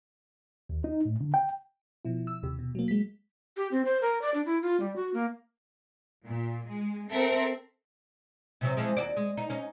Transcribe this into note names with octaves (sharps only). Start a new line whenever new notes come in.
D#2
D#4
A2
D3
G5
B2 F3 E4
E6
D#2 C3 G4
B2
F#3 A#3
G#3 B6
G4
C4
C5
A#4
D5
D4
E4
F4
G3
F#4
A#3
A#2
G#3
C4 A4 A#4 E5
C3 E3 F#3
E3 F3 G#3
D#2 F#4 D5
G#3
D#4
C#4 D#4